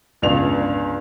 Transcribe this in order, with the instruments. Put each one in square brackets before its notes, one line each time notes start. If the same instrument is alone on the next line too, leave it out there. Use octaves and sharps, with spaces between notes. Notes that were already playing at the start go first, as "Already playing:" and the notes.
[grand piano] G1 C#2 D4 F7